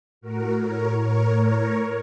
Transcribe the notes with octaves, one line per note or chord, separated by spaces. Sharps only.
A2 F#4 A#4
A#4 C#5
A2 A#4 C#5
A#4 C#5